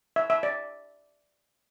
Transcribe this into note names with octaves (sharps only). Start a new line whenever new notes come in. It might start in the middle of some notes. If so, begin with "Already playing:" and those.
E5
E5
D5